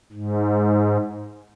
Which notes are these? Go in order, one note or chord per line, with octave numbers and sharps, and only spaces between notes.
G#2